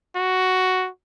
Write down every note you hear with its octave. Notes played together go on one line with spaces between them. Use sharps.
F#4